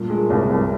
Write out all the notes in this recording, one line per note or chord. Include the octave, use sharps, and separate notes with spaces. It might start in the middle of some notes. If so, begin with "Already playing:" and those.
Already playing: G2 A#2
G#3
C2
C2